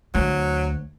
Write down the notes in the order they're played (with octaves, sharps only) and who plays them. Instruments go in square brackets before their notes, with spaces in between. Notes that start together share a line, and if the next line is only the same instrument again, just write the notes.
[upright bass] D2 [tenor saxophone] F#3